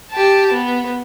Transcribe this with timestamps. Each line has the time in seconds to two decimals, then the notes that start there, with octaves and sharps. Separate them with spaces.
0.11 G4 A5
0.53 B3